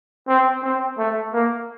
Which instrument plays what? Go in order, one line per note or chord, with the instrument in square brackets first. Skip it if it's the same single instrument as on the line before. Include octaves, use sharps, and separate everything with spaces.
[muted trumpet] C4
C4
A3
A#3